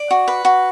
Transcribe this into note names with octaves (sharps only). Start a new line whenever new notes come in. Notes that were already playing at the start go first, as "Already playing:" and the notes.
Already playing: D5
F#4
B4
F#4